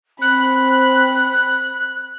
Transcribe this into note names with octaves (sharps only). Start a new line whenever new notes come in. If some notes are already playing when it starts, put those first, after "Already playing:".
C4 B5 F#6